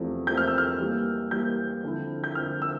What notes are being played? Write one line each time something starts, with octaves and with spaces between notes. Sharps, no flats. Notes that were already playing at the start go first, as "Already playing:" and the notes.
Already playing: E2 C3 F3 A3
E2 C3 F3 A3 G6
F6
E6
F6
E3 G3 A#3
E3 G3 A#3 G6
D3 F3 C4 E4
G6
D3 F3 C4 E4 F6
E6